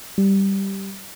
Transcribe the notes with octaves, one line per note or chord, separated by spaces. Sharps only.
G3